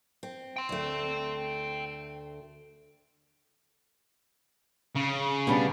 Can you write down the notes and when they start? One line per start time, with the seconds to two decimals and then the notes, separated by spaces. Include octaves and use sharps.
0.23 C4
0.56 G5 C6
0.69 D2 A3
4.96 C#3
5.47 B2 G3 D4